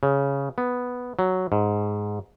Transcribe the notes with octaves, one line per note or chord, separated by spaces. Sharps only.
C#3
B3
F#3
G#2